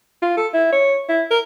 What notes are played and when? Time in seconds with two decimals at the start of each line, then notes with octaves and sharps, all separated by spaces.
0.22 F4
0.37 A4
0.54 E4
0.73 C#5
1.09 E4
1.31 A#4